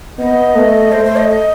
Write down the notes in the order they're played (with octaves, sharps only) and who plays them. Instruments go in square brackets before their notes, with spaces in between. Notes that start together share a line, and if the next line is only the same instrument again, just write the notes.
[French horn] B3 [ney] D#5
[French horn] A3
[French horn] A3 [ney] C5
[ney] C5
D#5
D#5